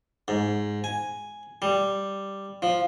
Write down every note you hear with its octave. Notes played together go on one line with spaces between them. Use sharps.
G#2
G#5
G3
F3